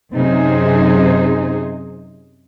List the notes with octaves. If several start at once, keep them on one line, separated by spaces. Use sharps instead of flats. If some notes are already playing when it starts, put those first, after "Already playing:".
F#2 C3 D#4 G#4 C5